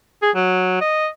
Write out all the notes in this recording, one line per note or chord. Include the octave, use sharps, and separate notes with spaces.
G#4
F#3
D#5